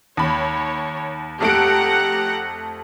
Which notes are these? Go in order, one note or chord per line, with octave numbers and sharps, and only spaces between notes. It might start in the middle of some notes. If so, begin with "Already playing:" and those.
D#2 C#5 B5
F2 A3 G4 F#5 A#5 D7